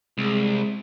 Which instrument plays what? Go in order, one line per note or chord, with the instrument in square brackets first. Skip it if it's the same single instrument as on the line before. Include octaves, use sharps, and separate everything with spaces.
[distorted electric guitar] C2 [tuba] G#3